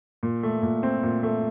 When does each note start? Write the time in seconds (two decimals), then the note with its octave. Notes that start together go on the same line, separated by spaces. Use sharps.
0.23 A#2
0.43 A3
0.63 A#2
0.83 C4
1.03 A#2
1.23 A3